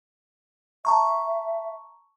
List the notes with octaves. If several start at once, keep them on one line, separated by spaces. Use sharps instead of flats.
E5 A5 A#5 C#6